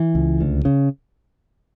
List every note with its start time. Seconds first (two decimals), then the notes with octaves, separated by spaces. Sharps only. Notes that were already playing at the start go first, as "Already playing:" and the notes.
Already playing: E3
0.15 C#2
0.41 D2
0.65 C#3